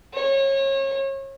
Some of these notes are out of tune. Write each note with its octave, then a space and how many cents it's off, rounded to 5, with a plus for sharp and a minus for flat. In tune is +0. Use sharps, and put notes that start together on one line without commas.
C#5 -30